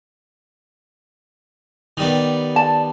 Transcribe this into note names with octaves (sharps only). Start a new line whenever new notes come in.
D#3 G3 B3
D5 A5